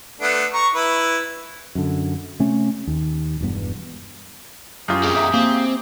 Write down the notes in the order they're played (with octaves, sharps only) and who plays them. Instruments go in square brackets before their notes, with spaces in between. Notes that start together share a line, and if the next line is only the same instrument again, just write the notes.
[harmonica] A3 B3 D4
A#5 C#6
E4 B4
[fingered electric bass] F#2 D3
C3 A3 C#4
D#2
E1 G2 B3
[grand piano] F#2 F4 [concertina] G4 G#4
[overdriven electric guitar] F2 G#3
[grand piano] E5 G5 A#5
[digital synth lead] A#3 [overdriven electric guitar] C4